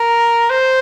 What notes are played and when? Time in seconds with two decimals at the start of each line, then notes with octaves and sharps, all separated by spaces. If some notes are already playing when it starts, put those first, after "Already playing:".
Already playing: A#4
0.50 C5